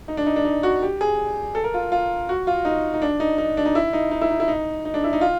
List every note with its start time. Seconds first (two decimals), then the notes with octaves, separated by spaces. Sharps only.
0.08 D#4
0.17 D4
0.26 D#4
0.36 D4
0.45 D#4
0.63 F#4
0.82 G4
1.01 G#4
1.55 A4
1.64 A#4
1.74 F4
1.92 F4
2.29 F#4
2.47 F4
2.65 D#4
2.94 D#4
3.02 D4
3.20 D#4
3.38 D#4
3.57 D4
3.65 D#4
3.75 E4
3.93 D#4
4.11 D#4
4.21 E4
4.30 D#4
4.40 E4
4.48 D#4
4.85 D#4
4.94 D4
5.04 E4
5.13 D#4
5.21 F4